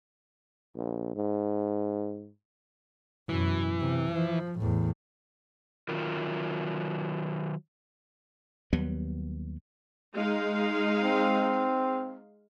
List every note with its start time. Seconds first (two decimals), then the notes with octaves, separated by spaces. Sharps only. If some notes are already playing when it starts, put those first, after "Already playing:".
0.75 A#1
1.16 G#2
3.29 F#2 B2 E3
3.80 C3
4.13 F3
4.60 E2 A2
5.89 D#3 F#3 F4 A#4
8.73 D#2 F#3 G3 B3
10.14 G#3 D#4 F5
11.03 C4